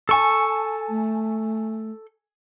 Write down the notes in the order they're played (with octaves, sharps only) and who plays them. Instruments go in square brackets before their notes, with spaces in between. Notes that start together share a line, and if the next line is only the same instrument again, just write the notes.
[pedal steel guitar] A4 C#6 [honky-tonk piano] G#5 A5
[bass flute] A3